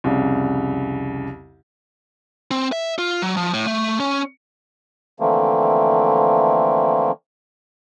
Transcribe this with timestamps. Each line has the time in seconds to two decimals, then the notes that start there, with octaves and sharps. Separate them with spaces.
0.04 C2 F2 C#3
2.51 C4
2.72 E5
2.98 F4
3.22 F#3
3.37 F3
3.53 A2
3.67 A3
4.00 C#4
5.20 D3 E3 F3 A3 A#3 C4